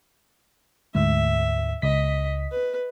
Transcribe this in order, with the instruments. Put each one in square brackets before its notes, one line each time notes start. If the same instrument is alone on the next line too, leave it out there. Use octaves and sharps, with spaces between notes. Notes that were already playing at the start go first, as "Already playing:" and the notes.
[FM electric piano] D2 G#2 [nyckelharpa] E5
[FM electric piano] C#2 B6 [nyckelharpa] D#5
[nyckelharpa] B4